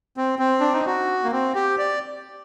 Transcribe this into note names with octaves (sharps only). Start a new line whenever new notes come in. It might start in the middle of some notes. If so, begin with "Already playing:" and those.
C4
C4
D4
D#4
F#4
A#3
C4
G4
D5